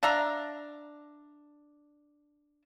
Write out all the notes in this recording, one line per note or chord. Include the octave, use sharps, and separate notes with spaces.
D4 E5 F5 A#5